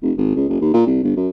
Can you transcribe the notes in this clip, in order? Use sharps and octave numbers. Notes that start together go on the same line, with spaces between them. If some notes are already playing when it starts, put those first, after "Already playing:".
F1
G#1
C#2
F#1
D#2
A#2
C2
G1
F#2